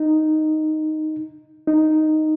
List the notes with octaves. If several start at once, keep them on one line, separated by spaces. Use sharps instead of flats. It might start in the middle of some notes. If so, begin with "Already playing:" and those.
Already playing: D#4
D#4